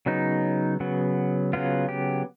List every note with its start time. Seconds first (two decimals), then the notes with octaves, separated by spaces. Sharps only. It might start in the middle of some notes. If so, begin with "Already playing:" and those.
0.06 C#3 F#3 B3 D#4
0.80 C#3 F#3 B3
1.53 C#3 F#3 B3 F4
1.89 G4